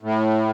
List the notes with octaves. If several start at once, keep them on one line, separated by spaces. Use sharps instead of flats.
A2